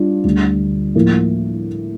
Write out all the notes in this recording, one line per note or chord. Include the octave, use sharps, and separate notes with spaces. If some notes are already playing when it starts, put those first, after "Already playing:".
Already playing: G3 D4 F4
D2 D3 G3
A2 F3 A#3